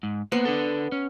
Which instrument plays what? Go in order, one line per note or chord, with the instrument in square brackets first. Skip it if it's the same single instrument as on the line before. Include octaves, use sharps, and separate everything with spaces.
[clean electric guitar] G#2
[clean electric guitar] A#3 C5 F#5 [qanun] B3
[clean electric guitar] D4 A4
C#4